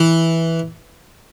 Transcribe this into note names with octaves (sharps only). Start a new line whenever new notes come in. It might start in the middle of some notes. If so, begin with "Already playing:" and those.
Already playing: E3